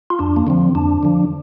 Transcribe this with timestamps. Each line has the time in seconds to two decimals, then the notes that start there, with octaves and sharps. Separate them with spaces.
0.10 F4
0.19 F2 D4
0.36 A#3
0.47 D3 F3 C4
0.75 F2 D4
1.03 D3 F3